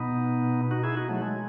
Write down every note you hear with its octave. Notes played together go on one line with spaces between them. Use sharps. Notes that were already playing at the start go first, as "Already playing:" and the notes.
Already playing: B2 B3 D#4
D#4 F#4
E4 G#4
D#4 F#4
F#3 A3
G#3